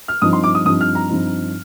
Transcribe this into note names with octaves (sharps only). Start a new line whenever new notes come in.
F6
G2 F3 C4 D#4 D#6
C6
D6
D#6
G2 F3 C4 D#4 D#6
F6
A#5
G2 F3 C4 D#4